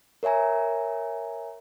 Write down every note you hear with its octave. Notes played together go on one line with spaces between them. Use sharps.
A#4 C#5 E5 G#5 A#5